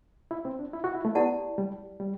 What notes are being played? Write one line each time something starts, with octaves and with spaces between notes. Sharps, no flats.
E4
C4
D4
E4
F#4
E4
A3
B3 E4 G4 D5 F#5 A5
G3
G3